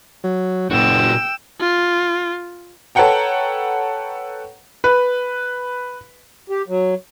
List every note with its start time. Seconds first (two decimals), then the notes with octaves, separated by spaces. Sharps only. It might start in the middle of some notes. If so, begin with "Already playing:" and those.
0.24 F#3
0.70 F#1 A#2 F#4 G5 E6
1.61 F4
2.95 A4 B4 C#5 F#5 G5 A#5
4.84 B4
6.50 G4
6.68 F#3